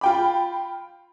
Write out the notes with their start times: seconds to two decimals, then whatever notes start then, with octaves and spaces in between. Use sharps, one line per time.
0.01 F4 G5 B5